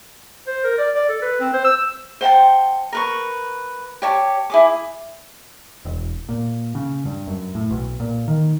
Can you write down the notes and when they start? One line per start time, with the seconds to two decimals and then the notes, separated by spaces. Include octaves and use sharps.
0.47 C5
0.64 A#4
0.78 D5
0.95 D5
1.09 A4
1.22 B4
1.40 C4
1.53 C5
1.65 E6
2.21 C5 F#5 G5 A5
2.93 A#4 B4 C#6
4.02 G4 C#5 A5
4.50 E4 G#4 D6
5.85 E1
6.29 A#2
6.75 C#3
7.05 G2
7.27 F#2
7.55 A2
7.71 B1
8.00 A#2
8.28 D#3